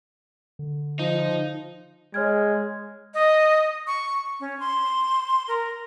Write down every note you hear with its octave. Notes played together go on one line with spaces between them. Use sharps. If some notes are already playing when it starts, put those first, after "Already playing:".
D3
F3 D#4
G#3 C#5 F6 G#6
D#5
C#6
C#4
C6
A#4